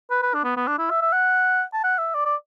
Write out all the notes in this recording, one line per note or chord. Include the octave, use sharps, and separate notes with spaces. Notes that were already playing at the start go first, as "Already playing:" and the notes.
B4
B4
D4
B3
B3
D4
E4
E5
E5
F#5
A5
F#5
E5
D5
D5